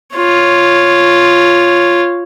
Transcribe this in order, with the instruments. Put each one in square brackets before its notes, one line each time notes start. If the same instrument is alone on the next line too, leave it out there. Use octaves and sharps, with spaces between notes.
[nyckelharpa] F4 C#5